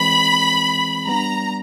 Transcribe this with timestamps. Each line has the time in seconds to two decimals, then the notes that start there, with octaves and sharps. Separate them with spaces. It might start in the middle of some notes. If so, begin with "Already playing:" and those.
Already playing: E3 G#3 C4 B5
1.07 G3 B3 D4 A#5